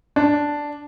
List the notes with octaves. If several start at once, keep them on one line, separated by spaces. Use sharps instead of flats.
D4